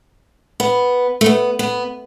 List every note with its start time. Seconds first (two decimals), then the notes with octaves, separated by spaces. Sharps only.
0.60 B3
1.21 A3
1.26 B3
1.59 B3